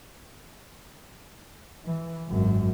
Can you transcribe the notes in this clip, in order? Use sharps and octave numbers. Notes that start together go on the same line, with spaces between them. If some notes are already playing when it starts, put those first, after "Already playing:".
E3
G#1 F#2